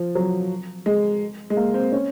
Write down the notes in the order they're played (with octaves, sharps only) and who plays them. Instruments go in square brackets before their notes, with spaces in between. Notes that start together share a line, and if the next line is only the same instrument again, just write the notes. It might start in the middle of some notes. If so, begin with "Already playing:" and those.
Already playing: [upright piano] F3
F#3
G#3
G#3
A#3
C4
C#4